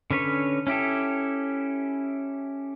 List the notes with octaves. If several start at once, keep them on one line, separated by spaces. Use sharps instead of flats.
D3 C#4 B4 C#5
C#4 E4 G4 A4